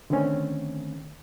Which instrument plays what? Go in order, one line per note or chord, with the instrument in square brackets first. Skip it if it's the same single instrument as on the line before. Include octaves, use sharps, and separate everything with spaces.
[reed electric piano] D3 D#3 A3 C4 C#4